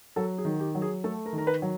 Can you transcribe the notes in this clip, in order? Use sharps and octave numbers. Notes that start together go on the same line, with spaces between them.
F#3 A4
G#4
D#3
G4
F#3
G#4
A3 A4
A#4
D#3
A#4
B4
F#3